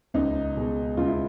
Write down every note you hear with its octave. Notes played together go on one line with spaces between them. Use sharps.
C#2 D#4
B2 G#3
C#2 F4
E4